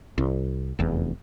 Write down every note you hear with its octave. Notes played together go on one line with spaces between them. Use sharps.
C2
F1 E2